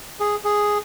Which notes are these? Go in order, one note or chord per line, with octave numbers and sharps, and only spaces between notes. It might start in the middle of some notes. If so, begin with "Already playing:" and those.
G#4
G#4